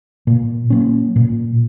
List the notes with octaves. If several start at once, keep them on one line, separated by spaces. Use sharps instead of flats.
A#2
F#3 A#3 C#4
A#2